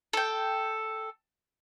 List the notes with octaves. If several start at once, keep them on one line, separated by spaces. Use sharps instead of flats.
A4 G5